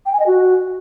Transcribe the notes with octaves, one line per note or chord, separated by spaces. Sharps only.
G5
G#5
D#5
F#4